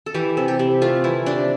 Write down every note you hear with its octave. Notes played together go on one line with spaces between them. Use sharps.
A4
E3 G4
C3 A4
G4
C3
A3 F4
E3 E4
C3 D4